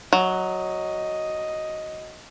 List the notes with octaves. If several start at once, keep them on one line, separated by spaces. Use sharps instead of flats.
F#3 D#5